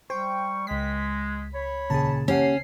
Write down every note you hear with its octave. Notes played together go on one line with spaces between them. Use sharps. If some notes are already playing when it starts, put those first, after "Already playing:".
G3 C5 G5 C#6
C#2 G#3 B6
C#5 B5
D#2 A#2 C#3 G#4 A5
A#3 C#4 G4 F#5 C7